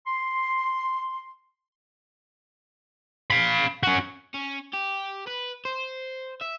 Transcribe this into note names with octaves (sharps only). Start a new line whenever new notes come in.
C6
F5 B5
C#4 F#4
C#4
G4
B4
C5
E5